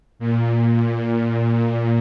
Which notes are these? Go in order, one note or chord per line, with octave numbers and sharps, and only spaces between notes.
A#2